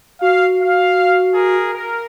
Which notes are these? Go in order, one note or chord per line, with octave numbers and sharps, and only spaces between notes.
F#4 F5
F5
G#4 A#4
A#4